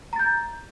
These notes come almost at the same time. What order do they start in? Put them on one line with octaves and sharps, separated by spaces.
A#5 A6 G6